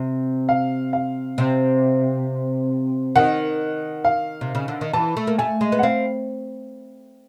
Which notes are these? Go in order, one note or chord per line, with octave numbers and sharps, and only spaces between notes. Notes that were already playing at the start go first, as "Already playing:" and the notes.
Already playing: C3
F5
F5
C3
D#3 F#5
F5
C3
C#3
D3
D#3
E3 A5
A3
A#3
A3 G#5
G#3
B3
F#5
C4 F5